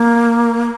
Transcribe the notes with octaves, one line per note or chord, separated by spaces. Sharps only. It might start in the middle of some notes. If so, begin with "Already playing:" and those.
Already playing: A#3